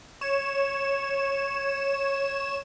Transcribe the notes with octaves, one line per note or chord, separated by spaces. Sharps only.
C#5 E7